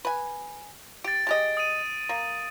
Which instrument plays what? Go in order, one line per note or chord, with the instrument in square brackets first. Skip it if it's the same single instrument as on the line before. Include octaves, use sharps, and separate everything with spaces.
[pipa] B4 G#5
[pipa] G4 [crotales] A6 D7
[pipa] G#3 G4 D#5
[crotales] D#6 D#7
[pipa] A#3